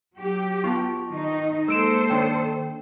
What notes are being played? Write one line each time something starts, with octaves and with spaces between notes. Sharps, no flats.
F#3 G4
B3 F4 A5 C#6
D#3 D#4
G#3 A#3 A4 C5 E6 D7 E7
D#3 D4 C#5 G5